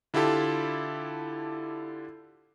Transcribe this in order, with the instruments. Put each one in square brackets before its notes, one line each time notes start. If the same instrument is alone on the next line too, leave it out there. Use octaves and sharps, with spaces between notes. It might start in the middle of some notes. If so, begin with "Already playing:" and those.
[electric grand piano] D3 E4 F4 G4 A4